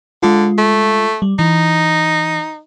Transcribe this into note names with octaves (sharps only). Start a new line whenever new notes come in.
D3 G#3 F4
A3
G3
E3 D#4